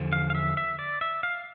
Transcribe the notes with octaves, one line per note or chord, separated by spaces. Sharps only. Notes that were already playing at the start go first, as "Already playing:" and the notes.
Already playing: E2 D3 F3
F5
F5
E5
E5
D5
E5
F5